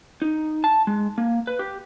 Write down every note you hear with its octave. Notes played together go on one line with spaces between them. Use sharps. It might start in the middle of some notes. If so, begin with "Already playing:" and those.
D#4
A5
G#3
A#3
B4
G4